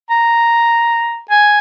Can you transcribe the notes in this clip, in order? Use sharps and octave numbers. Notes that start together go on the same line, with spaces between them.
A#5
G#5